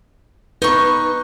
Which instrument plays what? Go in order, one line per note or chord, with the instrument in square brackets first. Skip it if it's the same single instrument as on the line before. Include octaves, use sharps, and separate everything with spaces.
[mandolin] D#4 C#6 [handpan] B4